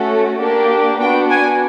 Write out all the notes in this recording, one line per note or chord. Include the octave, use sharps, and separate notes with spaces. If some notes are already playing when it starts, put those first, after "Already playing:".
Already playing: A3 C#4 F#4 A4
A#3 D4 G4
B3 D4 F#4 G5
G#5